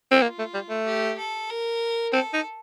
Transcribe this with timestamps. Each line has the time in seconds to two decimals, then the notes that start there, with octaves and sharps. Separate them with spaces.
0.11 C4
0.22 A#3 F4
0.39 A3
0.54 G3
0.70 A3
0.85 G4
1.18 A4
1.50 A#4
2.13 C4 A4
2.34 D#4